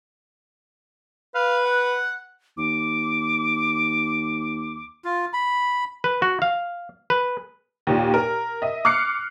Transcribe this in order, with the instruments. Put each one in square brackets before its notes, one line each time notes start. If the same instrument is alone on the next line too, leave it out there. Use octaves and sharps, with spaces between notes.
[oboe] B4 [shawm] F5
[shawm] F#5
[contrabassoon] D#2 [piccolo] D6
[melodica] F4
B5
[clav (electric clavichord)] B4
F#4
F5
B4
[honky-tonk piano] D#2 A#2
A#4
D#5 E5
D6 F6 F#6 C7 C#7